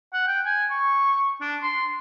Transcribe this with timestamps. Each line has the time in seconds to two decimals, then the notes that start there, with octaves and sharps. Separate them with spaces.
0.14 F#5
0.28 G5
0.46 G#5
0.71 C#6
1.41 D4
1.63 C6